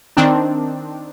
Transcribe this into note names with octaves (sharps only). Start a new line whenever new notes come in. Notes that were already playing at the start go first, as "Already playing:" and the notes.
D#3 C4 D4